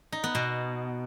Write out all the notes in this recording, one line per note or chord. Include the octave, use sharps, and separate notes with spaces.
D#4
B3
B2